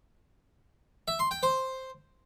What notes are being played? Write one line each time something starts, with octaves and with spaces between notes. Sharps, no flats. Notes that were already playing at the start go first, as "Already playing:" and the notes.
E5
C6
G5
C5